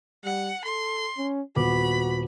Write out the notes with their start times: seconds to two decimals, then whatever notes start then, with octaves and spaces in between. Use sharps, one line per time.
0.25 G3 F#5
0.65 A4 C6
1.17 C#4
1.56 D#1 B3 F#4 B5 D6